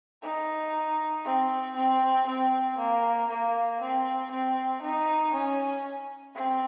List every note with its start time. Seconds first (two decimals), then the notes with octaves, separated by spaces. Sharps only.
0.23 D#4
1.25 C4
1.76 C4
2.26 C4
2.78 A#3
3.29 A#3
3.80 C4
4.31 C4
4.82 D#4
5.33 C#4
6.35 C4